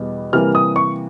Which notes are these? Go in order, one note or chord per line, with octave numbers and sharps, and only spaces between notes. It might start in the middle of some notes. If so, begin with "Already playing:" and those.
Already playing: E2 B2 G3 B3
C3 E3 G3 A#3 F6
D#6
C#6